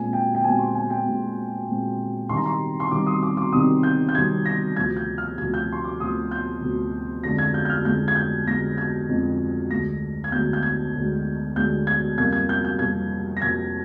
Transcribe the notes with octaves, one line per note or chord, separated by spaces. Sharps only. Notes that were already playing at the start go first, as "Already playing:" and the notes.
Already playing: A#2 G#3 C4 G#5
G5
G5
A#2 G#3 C4 G#5
C6
G#5
G5
A#2 G#3 C4
A#2 G#3 C4
C2 C3 D#3 G3 C6
A#5
C6
C6
C2 C3 D#3 G3 D6
D#6
D6
D6
C2 C3 D#3 G3 D#6
G6
G6
C2 C3 D#3 G3 G#6
A#6
D2 C3 F3 G#6
G6
F6
D2 C3 F3 G#6
G6
C6
D6
D2 C3 F3 D#6
G6
D2 C3 F3
F2 D3 G#3 A#6
G#6
G6
G6
F6
F2 D3 G#3 G6
G#6
G6
F2 D3 G#3 A#6
G#6
F2 D3 G#3
D2 D3 G#3 A#6
G#6
D2 D3 G#3 G6
G6
G#6
D2 D3 G#3
D2 D3 G#3 G6
G#6
F2 C3 G3 A#3 G#6
G#6
G6
G6
F2 C3 G3 A#3 G#6
A#6
F2 C3 G3 A#3 G#6